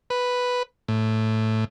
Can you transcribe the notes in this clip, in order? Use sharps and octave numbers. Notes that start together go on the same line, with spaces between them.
B4
A2